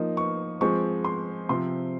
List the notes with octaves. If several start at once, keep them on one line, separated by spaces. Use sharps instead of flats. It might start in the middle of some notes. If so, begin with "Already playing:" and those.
Already playing: F3 A#3 D#4
C#6
F3 G#3 C4 C#6
C6
C3 F3 C4 C6